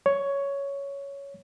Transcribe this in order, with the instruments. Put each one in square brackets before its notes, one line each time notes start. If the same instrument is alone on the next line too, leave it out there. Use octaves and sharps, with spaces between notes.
[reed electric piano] C#5